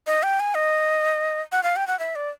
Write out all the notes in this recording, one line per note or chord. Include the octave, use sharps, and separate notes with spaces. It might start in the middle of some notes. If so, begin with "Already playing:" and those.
D#5
G5
G#5
D#5
F#5
F5
G5
F#5
E5
D5